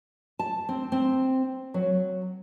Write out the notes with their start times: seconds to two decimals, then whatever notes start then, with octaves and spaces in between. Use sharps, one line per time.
0.39 A5
0.69 C4
0.92 C4
1.74 F#3